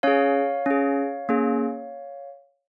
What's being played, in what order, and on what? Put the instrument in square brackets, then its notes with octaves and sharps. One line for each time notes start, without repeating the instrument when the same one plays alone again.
[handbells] C#4 G#4 C#5 F5
C#4 G#4
A#3 C#4 G#4